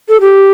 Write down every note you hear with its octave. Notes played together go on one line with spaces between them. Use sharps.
A4
G4